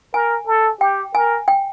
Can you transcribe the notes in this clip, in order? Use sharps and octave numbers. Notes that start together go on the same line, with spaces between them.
A#4 G#5
A4
G4 G5
A#4 G#5
G5